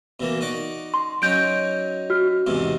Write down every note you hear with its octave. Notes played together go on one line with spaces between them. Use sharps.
B2 E3 A#3
D#4 F#4 D5
C6
F#3 C#4 D#4 G6 D7
F#4 F6
E2 G#2 C3